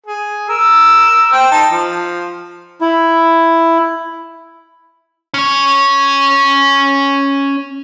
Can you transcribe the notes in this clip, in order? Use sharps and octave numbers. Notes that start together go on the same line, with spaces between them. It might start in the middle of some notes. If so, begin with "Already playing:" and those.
G#4
A#4 E6
C5 G5
D#4 A5
F3
E4
C#4 C#5